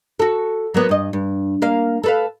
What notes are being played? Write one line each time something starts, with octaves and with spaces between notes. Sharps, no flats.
F#4 A4
F#3 A#3 B3
G2 D#5
G2
A#3 F5
A4 B4 F5